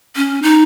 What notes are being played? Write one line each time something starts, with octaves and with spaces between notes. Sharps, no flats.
C#4
D#4